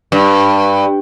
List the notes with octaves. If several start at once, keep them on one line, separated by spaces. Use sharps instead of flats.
G2